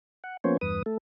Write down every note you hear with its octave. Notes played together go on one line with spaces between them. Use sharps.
F#5
F3 A#3 B3 C#4 C5 C#5
E2 G2 B4 D#6
A3 A4